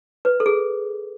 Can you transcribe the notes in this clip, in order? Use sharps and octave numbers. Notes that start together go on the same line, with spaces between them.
B4
A4
G#4